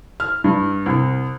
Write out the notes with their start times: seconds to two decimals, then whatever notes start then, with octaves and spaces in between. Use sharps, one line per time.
0.20 F6
0.44 G2
0.86 C2